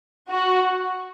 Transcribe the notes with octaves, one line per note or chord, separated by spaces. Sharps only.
F#4